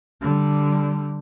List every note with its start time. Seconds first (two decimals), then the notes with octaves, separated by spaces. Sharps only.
0.21 D3 G3